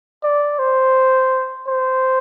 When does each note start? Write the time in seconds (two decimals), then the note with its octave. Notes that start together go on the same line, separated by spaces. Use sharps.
0.23 D5
0.59 C5
1.67 C5